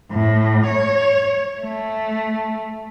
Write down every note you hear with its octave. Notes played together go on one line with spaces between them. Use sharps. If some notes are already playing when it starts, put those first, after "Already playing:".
A2
C#5
A3